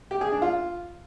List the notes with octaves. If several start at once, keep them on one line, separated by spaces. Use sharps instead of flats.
G4
G#4
D4
F4